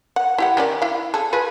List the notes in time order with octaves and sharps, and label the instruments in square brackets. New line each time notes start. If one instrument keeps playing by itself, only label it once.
[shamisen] F#5
E4 G4 F#5
D#3 C#4 D5
E4 F5
G#4 A4
F4 G#4 B4